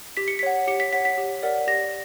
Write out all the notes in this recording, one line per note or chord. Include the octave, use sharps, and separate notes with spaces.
G4 B6
C#7
B6
C#5 F#5
G4 C#7
B6
C#5 F#5 B6
B6
G4
A#4 D5 F#5
G4 A#6